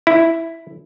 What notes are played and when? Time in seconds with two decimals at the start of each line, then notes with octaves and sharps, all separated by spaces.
0.07 E4